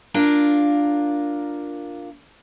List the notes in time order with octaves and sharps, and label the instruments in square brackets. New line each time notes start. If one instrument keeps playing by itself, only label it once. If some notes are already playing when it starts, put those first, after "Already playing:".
[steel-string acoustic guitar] A#3 D4 F4 A#4